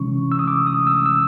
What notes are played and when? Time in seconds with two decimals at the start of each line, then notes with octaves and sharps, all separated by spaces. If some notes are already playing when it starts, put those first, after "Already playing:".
Already playing: C3 E3 G#3 C#4 C#6
0.32 E6
0.39 D#6
0.48 D6
0.67 D#6
0.87 E6
1.06 E6